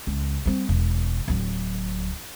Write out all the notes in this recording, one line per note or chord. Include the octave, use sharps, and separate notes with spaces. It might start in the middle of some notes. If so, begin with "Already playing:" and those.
C#2
G3 C4
E1
D1 F#3